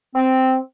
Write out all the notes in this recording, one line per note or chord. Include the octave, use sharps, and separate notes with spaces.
C4